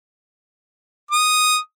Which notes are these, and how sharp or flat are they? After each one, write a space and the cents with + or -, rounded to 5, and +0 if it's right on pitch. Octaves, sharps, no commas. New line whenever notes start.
D#6 -5